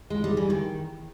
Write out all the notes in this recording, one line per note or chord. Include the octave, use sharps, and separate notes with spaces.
G#3
G3
E3
D#3